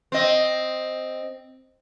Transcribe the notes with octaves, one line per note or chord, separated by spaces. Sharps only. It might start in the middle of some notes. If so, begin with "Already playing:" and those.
C4 D#5